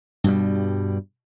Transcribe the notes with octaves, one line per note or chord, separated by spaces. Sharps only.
G2 B2 G3